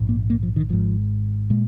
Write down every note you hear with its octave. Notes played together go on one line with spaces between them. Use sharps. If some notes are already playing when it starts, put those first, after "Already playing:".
Already playing: A#1 G#2
A#3
A#3
F3
D#3
G#1 G#2 F3
A#2 G#3